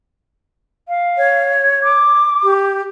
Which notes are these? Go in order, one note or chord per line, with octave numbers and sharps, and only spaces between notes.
F5
C#5
D6
G4